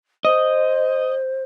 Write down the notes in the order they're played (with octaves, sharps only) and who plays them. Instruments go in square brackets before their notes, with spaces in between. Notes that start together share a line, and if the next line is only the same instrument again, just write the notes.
[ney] C5 [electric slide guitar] D#5